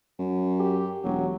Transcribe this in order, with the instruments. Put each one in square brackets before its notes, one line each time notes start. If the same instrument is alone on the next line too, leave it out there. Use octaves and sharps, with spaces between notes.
[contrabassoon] F#2
[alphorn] G4
[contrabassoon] E1 [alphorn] F#3